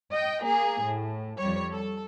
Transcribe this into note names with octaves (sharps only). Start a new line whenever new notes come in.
D#5 G5
A#3 G#4
A2
F2 G3 C#5
A4